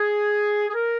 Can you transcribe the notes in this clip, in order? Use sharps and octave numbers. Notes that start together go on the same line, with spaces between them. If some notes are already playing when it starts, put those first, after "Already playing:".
Already playing: G#4
G#4
A#4